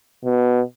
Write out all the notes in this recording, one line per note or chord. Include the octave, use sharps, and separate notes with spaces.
B2